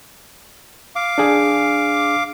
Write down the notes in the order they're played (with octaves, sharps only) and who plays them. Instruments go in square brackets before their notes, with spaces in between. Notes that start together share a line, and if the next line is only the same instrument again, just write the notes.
[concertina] F5 D6
[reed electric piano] D4 G#4